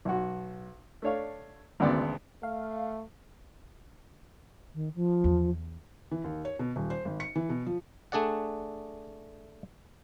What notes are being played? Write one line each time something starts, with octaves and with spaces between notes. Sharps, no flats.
B1 F#4
A3 D4 C#5 F5
G#1 D2 C#3 B3 D4 D5
A3 F5
D#3
F3
E2
E3
D#2
C#5
B2
D#1
C5
G#1
C#7
E3
B2
F3
A3 D4 G#4 D5 F#5